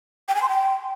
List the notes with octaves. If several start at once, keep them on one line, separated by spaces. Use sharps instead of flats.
G5
G#5
C6
G5